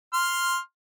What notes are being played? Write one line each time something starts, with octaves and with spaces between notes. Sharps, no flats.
C6 F6